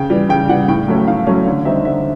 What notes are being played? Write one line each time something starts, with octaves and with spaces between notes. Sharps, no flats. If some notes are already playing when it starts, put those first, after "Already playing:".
Already playing: C#3 G5
E3 G3
C#3 G5
E3 G3 F#5
A2 G5
F#3 A3 C#4
A2 F5
F#3 A3 C#4
D3 C#5
G3 C4 D#4 E5
D3 E5